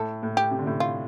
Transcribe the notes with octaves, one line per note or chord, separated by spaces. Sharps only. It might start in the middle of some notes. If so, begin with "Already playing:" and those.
Already playing: A2 A4
A2
G4
C3
D3
A2 C3
F4